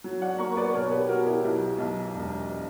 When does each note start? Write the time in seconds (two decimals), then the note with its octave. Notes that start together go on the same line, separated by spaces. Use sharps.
0.04 F#3
0.22 D5 F#5
0.38 A#3 A#5 C#6
0.56 B4 D5
0.73 B2 A#4 C#5
0.91 G4 B4
1.08 B2 F#4 A#4
1.26 E4 G4
1.44 B1
1.78 B1
2.14 E1